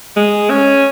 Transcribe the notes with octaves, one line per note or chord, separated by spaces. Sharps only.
G#3
C#4